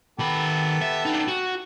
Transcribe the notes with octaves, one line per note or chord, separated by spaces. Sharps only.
D#3 B3 G4 A4 B5
E5
D4 D#4
F#4